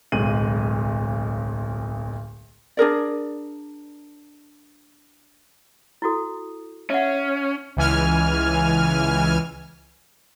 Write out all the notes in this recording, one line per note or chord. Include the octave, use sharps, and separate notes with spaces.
D1 B1 G#3 D#7 F#7
D4 G#4 A#4 D5
E4 F#4 A4
C#4 E5 F#5
C#2 E3 G#5 F6